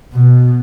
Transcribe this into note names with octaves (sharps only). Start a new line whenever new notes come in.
B2